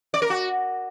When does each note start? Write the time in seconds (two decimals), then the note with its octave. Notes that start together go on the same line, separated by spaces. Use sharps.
0.14 D5
0.22 A#4
0.30 F#4